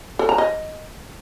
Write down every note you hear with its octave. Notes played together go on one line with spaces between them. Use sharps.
A4
A#5
D#5